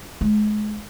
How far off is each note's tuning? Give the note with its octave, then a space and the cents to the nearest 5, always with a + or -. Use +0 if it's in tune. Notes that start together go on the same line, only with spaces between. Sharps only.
G#3 +30